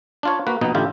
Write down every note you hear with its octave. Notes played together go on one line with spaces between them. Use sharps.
D4 F4 C#5
A#3 F#4 B4
A#1 B2 B3 D#4
A1 D3 E4 F4 G4